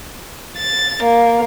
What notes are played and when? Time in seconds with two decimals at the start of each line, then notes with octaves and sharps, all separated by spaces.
0.57 A6
1.03 A#3